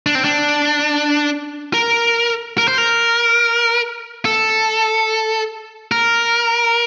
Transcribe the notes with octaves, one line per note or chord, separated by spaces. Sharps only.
D4
C4
D4
A#4
A#4
C5
A#4
A4
A#4